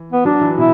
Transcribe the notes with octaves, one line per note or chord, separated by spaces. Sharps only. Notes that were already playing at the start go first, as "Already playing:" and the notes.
Already playing: E3
B3
F#3 D4
E3
B2 E4